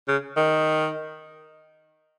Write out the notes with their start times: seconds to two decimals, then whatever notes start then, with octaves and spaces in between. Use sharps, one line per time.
0.08 C#3
0.37 D#3